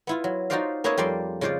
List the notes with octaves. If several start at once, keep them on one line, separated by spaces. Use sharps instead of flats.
B3 E4 F4
F#3
D#4 F4 F#4 C5 D5 F5
A#3 C#4 G#4 B4 C#5 E5
F2 G3 A#3 D5 C6
C#3 G#3 F4 C5 D5